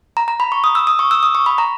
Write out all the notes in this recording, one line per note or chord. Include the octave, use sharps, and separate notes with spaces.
A#5
A#5
B5
C#6
D#6
E6
D#6
C#6
E6
D#6
C#6
B5
A#5